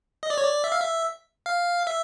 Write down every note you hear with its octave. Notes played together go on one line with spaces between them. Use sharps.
D#5
D5
C#5
D5
E5
F5
E5
F5
E5